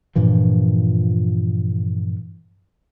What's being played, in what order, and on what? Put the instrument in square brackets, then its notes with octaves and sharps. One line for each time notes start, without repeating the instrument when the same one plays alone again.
[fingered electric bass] G2 A#2 E3 F3